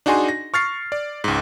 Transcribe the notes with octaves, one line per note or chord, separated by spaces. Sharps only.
D4 D#4 F#4 G#4 G#5 C6
A#6
C#6 F6 A6 C7
D5
C#2 G#2